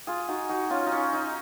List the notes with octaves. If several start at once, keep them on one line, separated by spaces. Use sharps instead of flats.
F4 G#4
D#4 F#4
D#4 F#4
C#4 F4
D#4
C#4
D#4